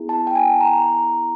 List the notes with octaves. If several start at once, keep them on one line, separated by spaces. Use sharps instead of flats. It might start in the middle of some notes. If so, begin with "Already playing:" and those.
Already playing: B3 E4 G#4
A5
G5
G#5
A#5